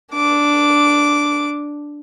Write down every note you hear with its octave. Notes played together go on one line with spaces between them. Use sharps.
D4 D6